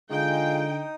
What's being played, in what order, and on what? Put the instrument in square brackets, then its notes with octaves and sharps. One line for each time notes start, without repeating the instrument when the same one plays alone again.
[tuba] D3 [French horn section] G#3 F4 [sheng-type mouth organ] D#4 D#6 [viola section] G5